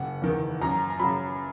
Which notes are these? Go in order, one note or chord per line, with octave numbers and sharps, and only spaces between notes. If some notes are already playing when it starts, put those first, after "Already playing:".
Already playing: F#1 F#5
E2 D#3
F#2 A#5
A#5
C#3 F#3 B5